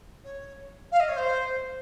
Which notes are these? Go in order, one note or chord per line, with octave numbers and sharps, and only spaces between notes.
C#5
F5
D#5
C#5
C5